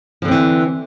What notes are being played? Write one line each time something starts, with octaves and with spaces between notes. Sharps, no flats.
D3 E3 F3 C4